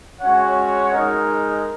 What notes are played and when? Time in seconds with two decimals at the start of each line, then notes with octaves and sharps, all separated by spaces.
0.21 G#3 C#4 F#4 C#5 F#5
0.93 G#3 D#4 A#4 D#5